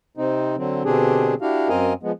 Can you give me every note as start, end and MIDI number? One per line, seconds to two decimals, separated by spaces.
0.17 0.56 48
0.17 0.56 60
0.17 0.56 63
0.57 0.83 50
0.57 0.83 54
0.57 0.83 60
0.85 1.34 47
0.85 1.34 50
0.85 1.34 60
0.85 1.34 62
0.85 1.34 67
0.85 1.34 68
1.41 1.69 62
1.41 1.69 64
1.41 1.69 66
1.41 1.69 67
1.41 1.69 77
1.69 1.93 42
1.69 1.93 60
1.69 1.93 70
1.69 1.93 75
1.69 1.93 77
1.69 1.93 80
2.03 2.12 53
2.03 2.12 56
2.03 2.12 59